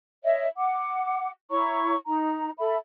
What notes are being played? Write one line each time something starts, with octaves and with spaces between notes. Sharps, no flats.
C#5 D#5 E5
F#5 D6
E4 C#5 A#5 C#6
D#4 A#5
A4 E5 B5